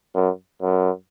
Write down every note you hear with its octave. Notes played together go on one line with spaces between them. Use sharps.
F#2
F#2